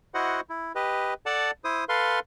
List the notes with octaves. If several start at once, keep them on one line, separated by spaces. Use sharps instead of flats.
E4 F#4 C5 D#5 F#5
E4
G4 B4 D#5
A4 D5 F#5 A5
E4 C5 D#6
A4 B4 F5 C6